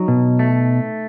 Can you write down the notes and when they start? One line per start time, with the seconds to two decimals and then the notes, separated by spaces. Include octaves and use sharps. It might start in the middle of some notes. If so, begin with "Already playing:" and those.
Already playing: F#3 D#4
0.08 B2
0.39 A3